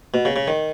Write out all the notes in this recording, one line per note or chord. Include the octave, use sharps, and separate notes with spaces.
B2
C#3
C#3
D#3